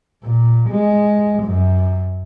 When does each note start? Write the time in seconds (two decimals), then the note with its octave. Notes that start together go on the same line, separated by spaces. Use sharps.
0.24 A#2
0.70 G#3
1.43 F#2